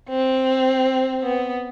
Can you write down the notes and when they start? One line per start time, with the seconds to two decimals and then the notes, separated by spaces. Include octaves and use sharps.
0.09 C4
1.23 B3